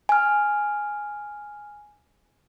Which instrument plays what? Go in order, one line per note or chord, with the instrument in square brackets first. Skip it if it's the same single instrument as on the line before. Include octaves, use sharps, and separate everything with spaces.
[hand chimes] G#5 F6